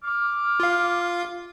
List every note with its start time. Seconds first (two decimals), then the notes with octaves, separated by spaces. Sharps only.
0.04 D6 F6
0.60 F4 F5